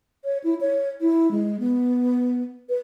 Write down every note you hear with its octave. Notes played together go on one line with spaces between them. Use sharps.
C#5
E4
C#5
E4
G#3
B3
B4